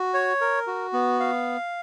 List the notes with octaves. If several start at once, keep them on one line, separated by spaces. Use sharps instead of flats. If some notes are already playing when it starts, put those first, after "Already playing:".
Already playing: F#4
C#5
A#4
F#4
B3
F5